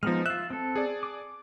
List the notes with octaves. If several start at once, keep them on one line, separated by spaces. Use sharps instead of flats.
F3 G#3 B3 D#4 F6
F4 E5 F#6
C4 A4
G#4 D5
D6